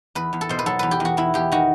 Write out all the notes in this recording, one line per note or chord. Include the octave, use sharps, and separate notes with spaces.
E2 B4
E2
A4
B2 C5
B4
F#3 A4
E2 B4
G4
E2 F#4
E2 E4
E2 G4
D#3 F#4